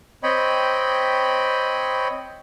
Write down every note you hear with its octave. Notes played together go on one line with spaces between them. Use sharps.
C4 C#5 D#5 G5 B5